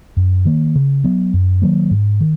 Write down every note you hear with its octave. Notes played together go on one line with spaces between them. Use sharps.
F#2
D#3 A#3
C#3
F#3 B3
F#2
D#3 F#3 A#3
G#2
D#3